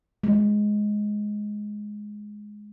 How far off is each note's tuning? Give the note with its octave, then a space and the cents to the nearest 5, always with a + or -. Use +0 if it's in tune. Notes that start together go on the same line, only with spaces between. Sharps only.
G#3 +5